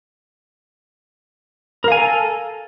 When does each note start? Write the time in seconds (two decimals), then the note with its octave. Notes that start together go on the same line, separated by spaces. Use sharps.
1.84 A#4
1.88 F5
1.92 G#5
1.96 A4